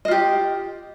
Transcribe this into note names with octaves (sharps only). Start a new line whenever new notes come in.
F4 G4 D#5